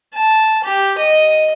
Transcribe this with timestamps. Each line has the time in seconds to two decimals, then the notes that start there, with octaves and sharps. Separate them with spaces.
0.14 A5
0.64 G4
0.98 D#5